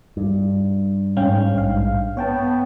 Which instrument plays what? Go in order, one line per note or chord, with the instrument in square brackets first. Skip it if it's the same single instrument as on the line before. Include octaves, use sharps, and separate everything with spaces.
[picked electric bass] G2
[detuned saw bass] G#2 [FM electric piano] C#4 F5 G5
[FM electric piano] A#1 F5
[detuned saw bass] B3 [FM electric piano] C#5 G5 A5